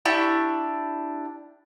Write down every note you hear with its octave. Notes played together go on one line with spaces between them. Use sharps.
D4 E4 G4 C#6